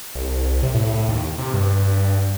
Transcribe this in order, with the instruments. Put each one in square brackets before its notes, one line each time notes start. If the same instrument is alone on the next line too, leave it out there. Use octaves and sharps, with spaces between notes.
[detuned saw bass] C2
C3
A2
D#2
C3
G2